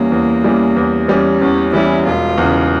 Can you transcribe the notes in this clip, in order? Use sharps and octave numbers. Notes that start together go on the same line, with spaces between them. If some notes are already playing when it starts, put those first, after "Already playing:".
Already playing: E2 E3 G3 A#3 C#4
E2
E3 G3 C#4
E2
E3 G3 C#4
E2 C#4
E3 G3 C#4 E4
E1 F4
E2 C#3